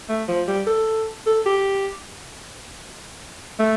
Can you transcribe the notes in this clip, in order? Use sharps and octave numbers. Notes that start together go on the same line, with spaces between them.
A3
F3
G3
A4
A4
G4
A3